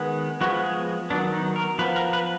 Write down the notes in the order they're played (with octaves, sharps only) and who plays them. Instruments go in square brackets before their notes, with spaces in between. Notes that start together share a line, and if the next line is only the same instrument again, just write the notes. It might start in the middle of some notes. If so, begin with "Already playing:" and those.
Already playing: [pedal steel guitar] D#3 G#3 B3
F3 G#3 B3 F#4
G#4
D#3 F#3 B3 D4
D#4
A#4
F3 B3 B4
A#4
B4